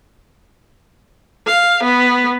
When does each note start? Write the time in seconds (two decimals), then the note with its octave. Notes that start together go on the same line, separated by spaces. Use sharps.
1.47 F5
1.83 B3